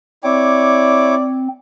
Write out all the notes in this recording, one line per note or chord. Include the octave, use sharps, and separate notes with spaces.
C4 E4 C#5 D5 D6